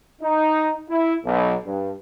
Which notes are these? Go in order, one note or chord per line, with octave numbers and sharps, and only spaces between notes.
D#4
E4
B1
G2